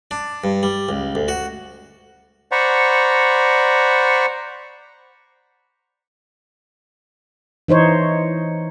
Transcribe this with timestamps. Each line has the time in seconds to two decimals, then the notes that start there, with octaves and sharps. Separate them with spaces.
0.11 D4
0.44 G2
0.63 G3
0.89 C#2
1.15 D2
1.28 F#4
2.52 C5 D5 F#5 A#5 B5 C#6
7.68 E3 D#4 C5 C#5